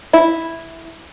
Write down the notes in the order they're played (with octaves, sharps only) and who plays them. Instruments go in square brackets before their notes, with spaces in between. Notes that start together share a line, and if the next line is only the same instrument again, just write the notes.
[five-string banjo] E4